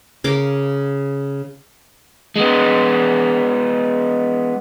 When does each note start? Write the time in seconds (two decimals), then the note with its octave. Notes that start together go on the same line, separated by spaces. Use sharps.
0.24 C#3 A#4 F5 D6
2.36 G#3 B3